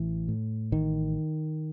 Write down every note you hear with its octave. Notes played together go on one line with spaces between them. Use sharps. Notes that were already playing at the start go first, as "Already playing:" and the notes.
Already playing: A1 E3
A2
A1 D#3